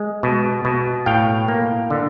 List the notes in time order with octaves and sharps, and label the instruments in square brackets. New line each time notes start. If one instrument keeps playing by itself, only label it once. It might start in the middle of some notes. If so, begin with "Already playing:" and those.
Already playing: [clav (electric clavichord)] G#3
B2
B2
A2 F5 G5
A#3
D3